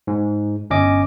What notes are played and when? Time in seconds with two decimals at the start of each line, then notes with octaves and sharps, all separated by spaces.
0.07 G#2
0.70 G1 C#4 D#5 D6